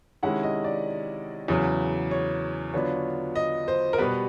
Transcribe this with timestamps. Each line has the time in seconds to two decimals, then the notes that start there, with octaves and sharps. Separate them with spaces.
0.23 C3 D#3 G#3 C#4 E4 F#5
0.43 D#5
0.64 D5
1.48 E2 C#3 F#3
2.11 C#5
2.74 D3 F#3 B3 D4 F4 C#5
3.35 D#5
3.68 C5
3.93 A#4
3.98 B2 G3 B3 B4